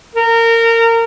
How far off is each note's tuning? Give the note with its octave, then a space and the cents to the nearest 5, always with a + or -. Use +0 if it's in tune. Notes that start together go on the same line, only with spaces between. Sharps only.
A#4 -25